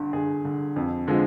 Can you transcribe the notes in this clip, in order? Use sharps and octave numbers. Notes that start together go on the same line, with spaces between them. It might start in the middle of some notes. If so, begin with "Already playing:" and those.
Already playing: G1 G2 D3
G1 G#4
G2 D3
F2
D3 F3 G#3